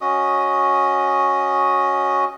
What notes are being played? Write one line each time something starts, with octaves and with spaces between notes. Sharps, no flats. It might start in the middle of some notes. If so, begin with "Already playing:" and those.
C#4 F#4 D#5 D#6